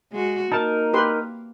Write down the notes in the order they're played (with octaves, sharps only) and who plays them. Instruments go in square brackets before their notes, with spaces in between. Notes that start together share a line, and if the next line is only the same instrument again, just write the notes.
[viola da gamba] G#3 F#4
[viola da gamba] A#3 [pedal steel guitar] D#4 A#4 [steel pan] A5
[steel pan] G4 B4 C6